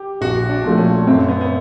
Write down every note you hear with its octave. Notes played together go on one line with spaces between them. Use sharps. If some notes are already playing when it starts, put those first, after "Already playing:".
Already playing: G4
A#1 F#4
D4
A#2 F3 A3
C#4
F#2 C4
B3
B3